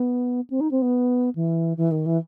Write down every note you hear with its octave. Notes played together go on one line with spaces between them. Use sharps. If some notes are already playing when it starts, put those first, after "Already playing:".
Already playing: B3
C4
D#4
C4
B3
E3
E3
D#3
E3